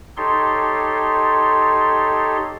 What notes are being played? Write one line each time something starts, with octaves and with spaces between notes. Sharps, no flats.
D#4 G4 A4 C#5 C6